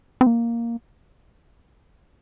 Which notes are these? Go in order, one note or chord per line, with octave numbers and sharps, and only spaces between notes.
C4
A#3